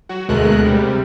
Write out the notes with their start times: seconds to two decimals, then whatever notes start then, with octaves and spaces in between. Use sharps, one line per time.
0.09 F#3 F#4
0.29 D2 B2 G#3 A3 A#4 F#6
0.65 C3 G3